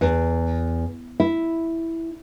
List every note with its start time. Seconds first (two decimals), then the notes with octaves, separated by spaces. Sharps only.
0.01 E2
1.20 E4